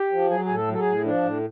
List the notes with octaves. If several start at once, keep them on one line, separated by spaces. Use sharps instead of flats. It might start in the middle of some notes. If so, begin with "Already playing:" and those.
Already playing: G4
F3
F#3 G#4
A2 G#4
A4
F#3
A4
G#4
A2
F3 D4
A2